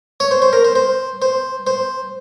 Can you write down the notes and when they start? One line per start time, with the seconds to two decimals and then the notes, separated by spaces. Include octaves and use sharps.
0.20 C#5
0.31 C5
0.42 C5
0.53 A#4
0.64 C5
0.76 C5
1.22 C5
1.67 C5